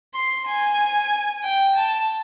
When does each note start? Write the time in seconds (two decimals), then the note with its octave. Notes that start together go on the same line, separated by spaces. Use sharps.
0.14 C6
0.47 G#5
1.44 G5
1.76 A5